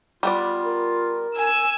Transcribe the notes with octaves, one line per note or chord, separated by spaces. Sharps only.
G3 B3 F4 D5
A#4
G#5 E6